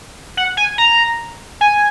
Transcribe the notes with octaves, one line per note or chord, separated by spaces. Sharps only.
F#5
G#5
A#5
G#5